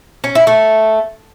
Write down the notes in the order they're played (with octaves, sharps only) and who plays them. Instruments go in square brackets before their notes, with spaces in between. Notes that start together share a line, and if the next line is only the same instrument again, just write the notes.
[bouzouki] C#4
E4
A3